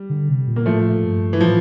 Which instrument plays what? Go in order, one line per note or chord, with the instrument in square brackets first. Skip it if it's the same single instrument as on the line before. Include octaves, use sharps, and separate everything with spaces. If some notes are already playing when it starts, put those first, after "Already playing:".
Already playing: [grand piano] G3
[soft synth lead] D3
C3
A#2
[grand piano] A#3
[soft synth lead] A2 [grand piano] F3 A3
[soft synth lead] G2
[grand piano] E3
[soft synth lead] A2 [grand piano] F3